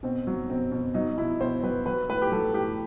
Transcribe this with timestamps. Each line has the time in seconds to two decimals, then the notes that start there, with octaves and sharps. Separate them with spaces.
0.03 B2 C4
0.27 F#3
0.50 B2 C4
0.72 B2
0.94 F#3 D#4
1.18 B2 E4
1.40 B2 C5
1.63 F#3 B4
1.86 F#3 B4
2.09 A2 B4
2.22 G4
2.32 F#3 A4
2.54 A2 G4